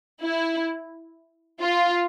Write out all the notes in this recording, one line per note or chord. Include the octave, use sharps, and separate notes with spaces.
E4
F4